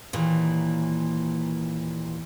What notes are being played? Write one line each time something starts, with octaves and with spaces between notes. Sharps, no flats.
D#2 A#2 E3